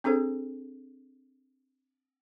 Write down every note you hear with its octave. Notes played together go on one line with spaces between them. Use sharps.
C4 D4 G#4 A4 C5